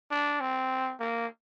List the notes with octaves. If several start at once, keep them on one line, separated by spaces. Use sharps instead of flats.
D4
C4
A#3